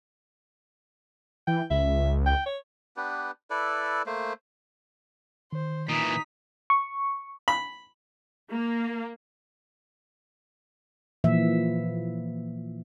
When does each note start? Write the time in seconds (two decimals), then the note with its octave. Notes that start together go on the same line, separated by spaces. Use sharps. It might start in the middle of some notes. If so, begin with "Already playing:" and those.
1.47 E3 G5
1.70 C#2 E5
2.26 G5
2.46 C#5
2.97 B3 D4 G4 B4
3.50 E4 A4 B4 D5
4.06 A3 A#3 C5
5.53 D#3 C5
5.89 A#2 E3 D#4 B6
6.70 C#6
7.48 B5
8.49 A#3
11.24 A#2 E3 F3 E5